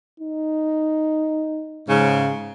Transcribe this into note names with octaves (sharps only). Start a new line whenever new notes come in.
D#4
G#2 C#3